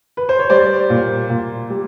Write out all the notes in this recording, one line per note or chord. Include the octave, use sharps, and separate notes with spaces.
B4
C5
C#5
G3 C5 D5
A#2
A#2
G3